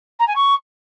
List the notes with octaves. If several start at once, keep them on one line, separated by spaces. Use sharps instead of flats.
A#5
G#5
C#6